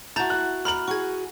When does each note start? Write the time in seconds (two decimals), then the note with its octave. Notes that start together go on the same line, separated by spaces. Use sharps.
0.16 E4 F#4 A5 A#5 G6 A6
0.30 F#6
0.65 A#5 B5 F6 F#7
0.88 F#4 G#4 C#6 G#6